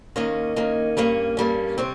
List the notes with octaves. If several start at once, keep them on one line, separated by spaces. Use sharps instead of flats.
D#2 D#3 A#3 C#4 D#5
D#2 D#3 A#3 C#4
G2 G3 A#3 C#4 C#5
G2 G3 A#3 C#4
C3 G3 C4 C#5